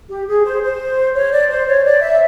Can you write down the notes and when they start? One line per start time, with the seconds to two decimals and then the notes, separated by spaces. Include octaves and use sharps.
0.09 G4
0.27 G#4
0.45 C5
0.61 C5
1.15 C#5
1.32 D5
1.50 C5
1.67 C#5
1.84 D5
2.01 E5